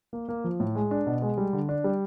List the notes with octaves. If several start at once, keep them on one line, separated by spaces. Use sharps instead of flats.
A#3
A#3
F3
A2
G#3
D4
B2
G#3
G3
D3
D4
G3